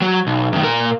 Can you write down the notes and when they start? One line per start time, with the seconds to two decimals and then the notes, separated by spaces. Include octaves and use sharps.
0.02 F#3
0.27 B1
0.53 F#2 D#3
0.64 A#2 A#4